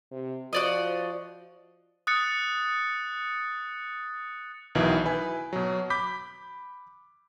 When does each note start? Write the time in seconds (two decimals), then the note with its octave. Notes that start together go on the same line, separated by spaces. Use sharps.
0.11 C3
0.53 F3 F#4 D5 D#5
2.07 D#6 F#6 A6 C#7
4.75 B1 B2 D#3 E3 E4
5.05 E4 B4 G#5
5.53 B2 F#3
5.90 B5 D6 G6 B6